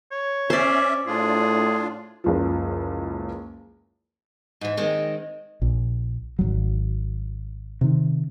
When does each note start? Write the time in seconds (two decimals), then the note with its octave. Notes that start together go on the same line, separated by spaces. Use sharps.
0.11 C#5
0.50 C#4 C5 D5 E5
1.07 A2 D4 F4 G#4
2.24 F#1 C#2 F3
4.61 G#2 E3
4.77 D#3 G#3 C4
5.62 A#1
6.39 G#1 C#2 F#3
7.81 C3 D#3